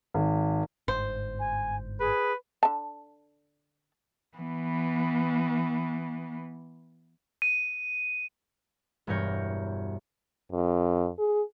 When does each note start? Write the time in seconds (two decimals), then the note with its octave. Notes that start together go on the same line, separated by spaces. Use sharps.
0.14 G#1
0.88 G1 G#2 C5
1.40 G#5
2.00 G#4 B4
2.63 D3 A5
4.37 E3 B3
7.42 D#7
9.07 E1 G2 B3 A#4 C#5 G6
10.52 F2
11.19 G#4